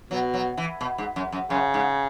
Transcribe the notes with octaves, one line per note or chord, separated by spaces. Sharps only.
B2 F#3
F#3
E3
B2
G#2
F#2
F#2
F#2 C#3
G#2